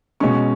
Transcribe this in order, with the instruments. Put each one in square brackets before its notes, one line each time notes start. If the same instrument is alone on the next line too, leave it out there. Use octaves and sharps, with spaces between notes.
[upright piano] B2 G#3 C#4 C#6